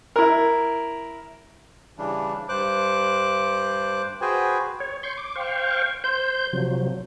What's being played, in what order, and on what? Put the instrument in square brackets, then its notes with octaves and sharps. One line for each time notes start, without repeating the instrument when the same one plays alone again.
[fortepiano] E4 A#4
[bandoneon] C#3 E3 G3 D4
G2 C5 D6 F#6
F#4 G#4 B4 C5 G5 G#5
[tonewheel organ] C#5
C6 C#6 G6
D6
C5 F5 G5 C#6
C5 G6
C3 F3 F#3